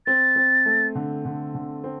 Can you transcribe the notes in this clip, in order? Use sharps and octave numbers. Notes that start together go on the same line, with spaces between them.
C4 A6
C4
A3
D3
D3
D3
C4